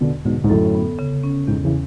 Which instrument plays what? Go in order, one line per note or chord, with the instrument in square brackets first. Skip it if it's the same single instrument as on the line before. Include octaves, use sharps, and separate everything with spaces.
[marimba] E2 [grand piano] B2 D3
[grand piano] G#2 B2 [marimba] D3
[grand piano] G#2
[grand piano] F#2 A2 [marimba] A4
[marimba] B3
C#3
C#4
[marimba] E2 [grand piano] G#2
[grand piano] C#3 E3